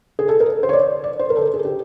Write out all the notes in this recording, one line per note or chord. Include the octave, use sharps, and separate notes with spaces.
G#4
A4
A#4
C5
C#5
D5
D5
C5
A#4
A4
A#4
G#4
G4